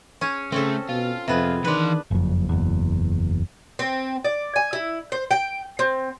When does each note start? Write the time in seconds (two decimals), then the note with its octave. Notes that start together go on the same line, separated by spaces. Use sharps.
0.21 C#4 G#4 C#5
0.52 C#3 A3 C4 C#4 A4
0.89 B2 F4
1.28 F2 C3 B3 G#4
1.65 D#3 E3 D4 B4 C6
2.11 F#1 F2
2.49 F#1 E2
3.79 C4
4.25 D5
4.56 G#5
4.73 E4
5.12 C5
5.31 G5
5.79 C4